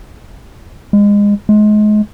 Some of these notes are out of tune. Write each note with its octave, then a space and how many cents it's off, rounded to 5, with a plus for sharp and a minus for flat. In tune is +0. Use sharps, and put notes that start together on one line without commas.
G#3 -25
G#3 +30